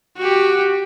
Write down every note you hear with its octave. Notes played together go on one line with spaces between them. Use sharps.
F#4 G4